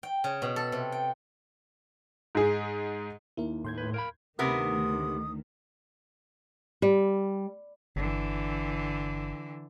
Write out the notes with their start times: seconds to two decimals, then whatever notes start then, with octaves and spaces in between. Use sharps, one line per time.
0.03 G5
0.24 C#3
0.42 B2
0.56 A4
0.72 C3
0.92 G5
2.35 G#2 G#4
3.37 D#2 E4 A#4
3.65 A2 C6 G6 G#6
3.78 B4
3.94 A#4 F5 B5
4.39 D2 C3 D#3 B3 A#4 D#6
6.82 G3
7.96 G1 D3 E3